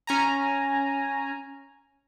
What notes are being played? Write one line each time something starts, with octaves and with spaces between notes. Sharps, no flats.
C#4 G#5 A#5